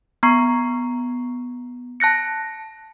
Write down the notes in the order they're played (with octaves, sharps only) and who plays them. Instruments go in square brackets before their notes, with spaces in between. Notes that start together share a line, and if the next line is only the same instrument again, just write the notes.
[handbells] B3 A#5 C#6 C7
A5 F#6 A#6 C#7